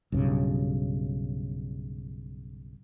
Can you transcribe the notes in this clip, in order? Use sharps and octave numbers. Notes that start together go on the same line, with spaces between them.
B1 G2 C#3